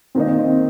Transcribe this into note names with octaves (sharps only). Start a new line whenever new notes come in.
D#3 A#3 C4 D#4
C4